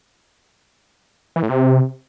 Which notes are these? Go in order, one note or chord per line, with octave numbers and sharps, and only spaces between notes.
E3
A2
C3